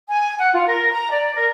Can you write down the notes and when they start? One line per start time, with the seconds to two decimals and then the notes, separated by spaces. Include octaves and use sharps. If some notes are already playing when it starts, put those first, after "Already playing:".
0.09 G#5
0.38 F#5
0.54 F4
0.68 A#4
0.92 A#5
1.11 D5
1.34 A#4